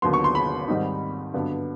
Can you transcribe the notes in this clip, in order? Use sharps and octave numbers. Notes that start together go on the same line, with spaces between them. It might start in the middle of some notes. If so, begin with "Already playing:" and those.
D#2 D3 F#3 B3 C6
C#6
C6
B5
G#2 D#3 G3 C4 D#4
G2 D3 F#3 B3